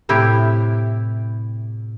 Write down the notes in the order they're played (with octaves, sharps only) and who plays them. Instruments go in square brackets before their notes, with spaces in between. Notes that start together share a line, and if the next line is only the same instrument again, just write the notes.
[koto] A2 C3 E4 G4